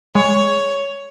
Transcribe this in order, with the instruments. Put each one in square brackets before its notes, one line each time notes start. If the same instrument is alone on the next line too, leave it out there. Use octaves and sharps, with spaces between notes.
[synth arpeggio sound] G#3 [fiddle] C#5